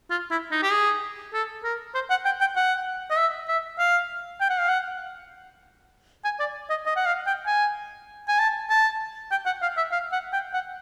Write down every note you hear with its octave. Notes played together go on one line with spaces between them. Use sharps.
F4
E4
D#4
G4
G#4
A4
A#4
C5
F#5
G5
G5
F#5
D#5
E5
E5
F5
G5
F#5
F5
F#5
G#5
D5
D#5
D#5
F#5
F5
G5
G#5
G#5
A5
A5
G5
F#5
F5
E5
F5
F#5
G5
F#5